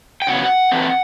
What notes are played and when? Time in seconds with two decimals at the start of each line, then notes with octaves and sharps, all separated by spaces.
0.22 G5
0.27 C#3 F#3 B3 F#5
0.71 E3 A3 C4